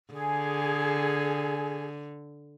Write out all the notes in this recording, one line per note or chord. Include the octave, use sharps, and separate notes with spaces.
D3 G#4